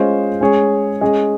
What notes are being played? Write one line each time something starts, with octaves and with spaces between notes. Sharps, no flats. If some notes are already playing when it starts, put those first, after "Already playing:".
Already playing: G#3 C#4 F4 C5 D#5
G#3 C#4 G#4 C#5
G#3 C#4 G#4 D#5